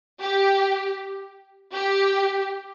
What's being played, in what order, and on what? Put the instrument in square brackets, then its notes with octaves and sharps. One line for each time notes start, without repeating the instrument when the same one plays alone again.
[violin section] G4
G4